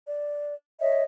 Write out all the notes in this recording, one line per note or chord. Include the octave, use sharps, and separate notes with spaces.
D5
C#5 D#5 E5